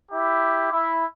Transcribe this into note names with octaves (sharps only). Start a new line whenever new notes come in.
E4 G4
E4